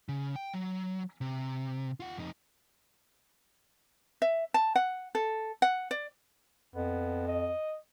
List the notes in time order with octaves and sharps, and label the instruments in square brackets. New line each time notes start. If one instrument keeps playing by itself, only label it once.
[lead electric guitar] C#3
G5
F#3
C3
F4 F#5
F2 D#4
[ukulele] E5
A5
F#5
A4
F#5
D5
[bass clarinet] F2 [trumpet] B3
[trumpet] D#5